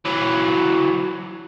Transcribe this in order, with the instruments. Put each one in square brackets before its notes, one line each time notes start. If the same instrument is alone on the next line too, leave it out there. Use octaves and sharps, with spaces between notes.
[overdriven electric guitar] E3 F#3